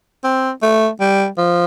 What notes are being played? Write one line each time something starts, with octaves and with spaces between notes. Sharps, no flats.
C4
A3
G3
F3